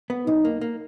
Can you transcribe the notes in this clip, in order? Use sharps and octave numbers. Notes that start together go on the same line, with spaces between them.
B3
B1 D#4
A#3
A#3